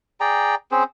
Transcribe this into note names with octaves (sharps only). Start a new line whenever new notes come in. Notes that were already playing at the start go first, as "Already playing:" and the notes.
G#4 D5 G5 A#5
C4 C#4 G#4 C5